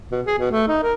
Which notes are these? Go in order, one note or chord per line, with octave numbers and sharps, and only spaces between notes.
B2
G#4
B2
A3
D#4
A#4